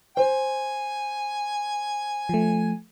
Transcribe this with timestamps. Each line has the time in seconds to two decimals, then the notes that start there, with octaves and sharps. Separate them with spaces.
0.17 C5 G#5
2.29 F3 A3